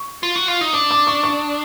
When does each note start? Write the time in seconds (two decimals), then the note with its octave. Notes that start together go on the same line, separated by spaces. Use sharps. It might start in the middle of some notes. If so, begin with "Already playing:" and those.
Already playing: C#6
0.23 F4
0.36 F#4
0.48 F4
0.61 D#4
0.73 D4 D#6
0.91 D6
1.07 C#6
1.23 C#6